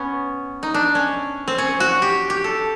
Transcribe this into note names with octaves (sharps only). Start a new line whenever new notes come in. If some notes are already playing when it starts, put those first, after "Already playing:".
Already playing: B3 C#4
D#4
D4
C#4
C4
C#4
F#4
G4
G4
A4